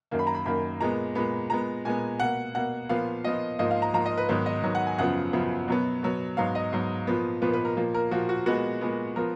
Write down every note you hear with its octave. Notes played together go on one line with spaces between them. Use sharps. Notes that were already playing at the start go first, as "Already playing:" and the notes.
F#2 D#3 A#3
B5
A#5
B5
F#2 D#3 A#3 B5
A#2 G#3 B3 A#5
A#2 G#3 B3 B5
A#2 G#3 B3 A#5
A#2 G#3 B3 G#5
B2 A#3 F#5
B2 A#3 F#5
A#2 F3 B3 F5
A#2 F3 B3 D#5
G#2 F3 A#3 D#5
F5
A#5
G#2 F3 A#3 A#5
D#5
B4
G#2 D#3 F#3 B3 B4
D#5
G#2 D#3 F#3 B3
F#5
G#5
F#2 C#3 F3 B3 F#5
F#2 C#3 F3 B3
B2 F#3 B3
B2 F#3 B3
G#2 F#3 B3 F5
D#5
G#2 F#3 B3
A#2 F3 B3
A#2 F3 B3 B4
B4
A#4
A#2 F3 A#3
A#4
A#2 F3 A#3 F#4
F#4
A#2 G#3 B3 F#4
A#2 G#3 B3
F3 B3 A#4